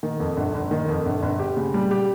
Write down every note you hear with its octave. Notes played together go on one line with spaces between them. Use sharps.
D#3
F2
G1
G1
D#3
F2
G1
G1
G4
C#3
G3
G4